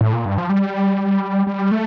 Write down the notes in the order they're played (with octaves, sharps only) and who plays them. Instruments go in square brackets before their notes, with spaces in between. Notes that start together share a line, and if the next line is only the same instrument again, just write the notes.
[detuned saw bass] A2
A#2
G2
F3
G3
G3
A3